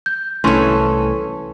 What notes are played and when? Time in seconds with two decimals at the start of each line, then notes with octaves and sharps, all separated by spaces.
0.06 G6
0.44 C2 E3 A3 C#4 A4 C6 C#6